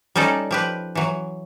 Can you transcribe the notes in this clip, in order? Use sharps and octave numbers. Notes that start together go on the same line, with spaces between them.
G3 C#4 D#4 A4 D5
F3 G4 B4
E3 F#3